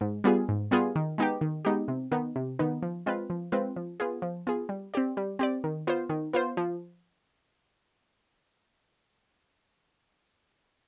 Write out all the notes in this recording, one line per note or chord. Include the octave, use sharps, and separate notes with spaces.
G#2
G3 B3 F4 G#4
G#2
G3 B3 F4 G#4
D#3
G#3 B3 D#4 G4
D#3
G#3 B3 D#4 G4
C3
D#3 B3 D#4
C3
D#3 B3 D#4
F3
G#3 C4 F4 B4
F3
G#3 C4 F4 B4
F3
B3 F4 G#4
F3
B3 F4 G#4
G3
C4 G4 D5
G3
C4 G4 D5
D#3
B3 F4 C5
D#3
B3 F4 C5
F3